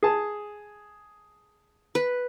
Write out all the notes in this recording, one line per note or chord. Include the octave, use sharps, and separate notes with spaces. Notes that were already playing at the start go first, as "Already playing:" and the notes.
G#4 A5
B4